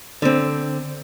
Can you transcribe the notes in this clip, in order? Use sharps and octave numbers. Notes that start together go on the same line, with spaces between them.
D3 C4